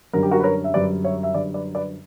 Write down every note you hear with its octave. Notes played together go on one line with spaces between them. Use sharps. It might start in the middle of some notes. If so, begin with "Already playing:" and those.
F#2 D3 G3 A#4
G4
F#4 A#4
B4
A#4 C#5
E5
F#2 D3 G3 B4 D5
C#5 E5
E5
F#2 D3 G3 B4 D5
B4 D5
B4 D5